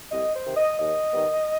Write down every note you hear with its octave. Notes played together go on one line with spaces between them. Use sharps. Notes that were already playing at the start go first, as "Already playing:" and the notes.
C2 D#5
C5
C3 D#3
D#5
D#2 D#5
D#3 G3 B3